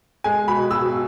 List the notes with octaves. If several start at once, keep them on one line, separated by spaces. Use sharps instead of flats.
G#3 G#5
B2 B5
B2 E6